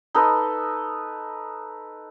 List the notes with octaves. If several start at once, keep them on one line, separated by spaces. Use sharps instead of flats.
D#4 A4 B4 D#5